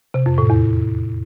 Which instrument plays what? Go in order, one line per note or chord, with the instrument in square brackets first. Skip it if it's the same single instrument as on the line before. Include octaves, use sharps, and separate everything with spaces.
[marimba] C3
F2
A2
E2